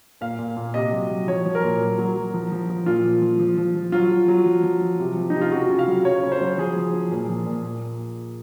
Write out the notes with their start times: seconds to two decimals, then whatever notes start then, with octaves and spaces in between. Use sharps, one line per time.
0.21 A#2 F5
0.39 A#2
0.57 A#2
0.74 C3 D#5
0.92 F#3
1.10 F#3
1.27 F3 C#5
1.45 F3
1.55 A#4
1.63 A#2
1.81 F#3
1.98 F#3
2.16 F#3
2.34 F3
2.52 F3
2.70 F3
2.86 A#2 F4
3.04 F3
3.22 F3
3.39 F3
3.58 F3
3.75 F3
3.92 F#3 F4
4.11 F#3
4.28 F#3
4.46 F3
4.63 F3
4.82 F3
5.00 C3
5.17 F3
5.30 C3 D#4
5.41 F4
5.52 C#3 F#4
5.70 C#3
5.79 F5
5.87 F#3
6.05 C#3 C#5
6.23 C#3
6.32 C5
6.41 F#3
6.58 F3 G#4
6.76 F3
6.93 F3
7.11 A#2
7.29 F3
7.46 A#2
7.64 A#2